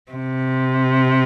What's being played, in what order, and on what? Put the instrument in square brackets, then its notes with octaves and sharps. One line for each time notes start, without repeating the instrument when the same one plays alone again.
[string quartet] C3